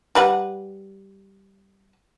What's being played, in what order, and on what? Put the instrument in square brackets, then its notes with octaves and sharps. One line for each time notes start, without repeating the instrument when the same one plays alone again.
[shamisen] G3 B4 F#5